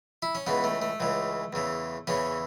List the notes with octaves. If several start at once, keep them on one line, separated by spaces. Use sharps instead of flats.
E4
C#4
C#2 C#3 E3 B3
A3
A3
C#2 C#3 E3
E2 C#3 E3
E2 C#3 E3 C#4